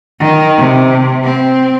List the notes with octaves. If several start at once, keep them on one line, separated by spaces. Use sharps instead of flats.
D#3
C3
C4